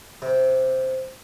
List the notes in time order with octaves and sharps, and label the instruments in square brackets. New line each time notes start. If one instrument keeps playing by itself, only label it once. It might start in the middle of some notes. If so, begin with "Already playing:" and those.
[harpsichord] C3